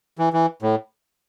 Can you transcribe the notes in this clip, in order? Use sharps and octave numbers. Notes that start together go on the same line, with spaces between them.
E3
E3
A2